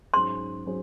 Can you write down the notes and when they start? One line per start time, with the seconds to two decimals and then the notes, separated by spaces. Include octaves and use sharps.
0.13 G#2 F#3 C#4 G#4 C5 C6
0.66 F#3 C#4 G#4 C5